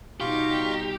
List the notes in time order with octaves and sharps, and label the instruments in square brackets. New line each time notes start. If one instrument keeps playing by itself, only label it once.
[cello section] B2 G3 D#4 [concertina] F4 F5 C#6 [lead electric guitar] G4